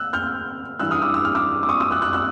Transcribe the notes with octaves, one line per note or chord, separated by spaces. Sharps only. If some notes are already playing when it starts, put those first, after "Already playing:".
Already playing: E6 F#6
F6 G6
G2 E3 E6 F#6
D#6 F6
D6 E6
E6
F6
D6 E6
D6
C#6 D#6
D6 E6
E6 F#6
E6 F#6
E6 F#6